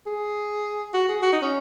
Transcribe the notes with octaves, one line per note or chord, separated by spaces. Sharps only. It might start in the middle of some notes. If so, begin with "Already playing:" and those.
G#4
F#4
G#4
F#4
D#4
C#4